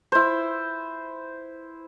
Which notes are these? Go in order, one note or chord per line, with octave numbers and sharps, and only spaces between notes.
E4 C5